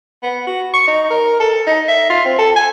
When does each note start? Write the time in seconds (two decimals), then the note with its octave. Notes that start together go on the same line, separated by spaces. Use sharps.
0.23 B3
0.47 F#4
0.74 C#6
0.87 D#4
1.11 A#4
1.40 A4
1.67 D#4
1.89 E5
2.10 F4
2.25 C4
2.39 A4
2.56 G#5